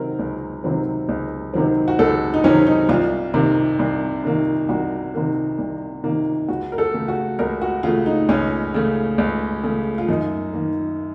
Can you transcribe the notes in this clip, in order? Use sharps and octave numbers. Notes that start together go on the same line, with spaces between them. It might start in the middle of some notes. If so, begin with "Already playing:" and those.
Already playing: C3 D#3 F#3 C4 A#4
C#2
C3 D#3 F#3 C4
C#2
C3 D#3 F#3 C4
F#4
C#2 A4
D#4
C3 D#3 F#3 C4 C#4
D#4
C2 F4
C3 D#3 A#3
C2
C3 D#3 A#3
C2 F#4
C3 D#3 A#3
C2
C3 D#3 A#3
C#2 F#4
A#4
A4
C#3 A3
F#4
C#2 A#4
F#4
C#3 A3 F4
D#4
C#2 C#4
C#3 A3
C#2
C#3 A3
F4
F#2 D#4
D#3 A#3